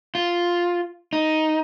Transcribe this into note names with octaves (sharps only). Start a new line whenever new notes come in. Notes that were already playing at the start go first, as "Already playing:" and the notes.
F4
D#4